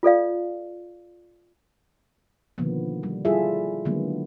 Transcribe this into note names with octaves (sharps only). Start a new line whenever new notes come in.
F4 A4 D5 F5
B2 D3 D#3 F3 A#3 B3
G3
G3 E4 F4 G#4 A4 E5
D3 D#3 F#3 G#3 A#3 B3